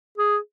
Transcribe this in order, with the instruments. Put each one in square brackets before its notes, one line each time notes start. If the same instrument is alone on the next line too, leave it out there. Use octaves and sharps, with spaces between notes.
[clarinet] G#4